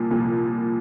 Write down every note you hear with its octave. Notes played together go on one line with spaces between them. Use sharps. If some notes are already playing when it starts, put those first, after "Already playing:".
Already playing: C2 A#2 F3
C2 A#2 F3